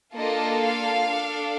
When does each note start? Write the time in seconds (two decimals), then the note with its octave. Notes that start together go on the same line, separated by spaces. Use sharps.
0.16 A#3 D4 F4 A4 D#5
0.62 F5
1.07 D4 A4